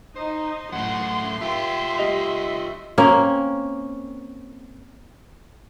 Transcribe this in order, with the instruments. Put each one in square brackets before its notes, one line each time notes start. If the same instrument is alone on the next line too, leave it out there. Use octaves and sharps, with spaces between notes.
[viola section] D#4 [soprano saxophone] C5
[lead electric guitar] F#2 A2 [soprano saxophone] F#5 [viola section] C6
[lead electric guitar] F4 G4 [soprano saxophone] E5
[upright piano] G3 D#5 F7
[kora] A#3 C4 C#4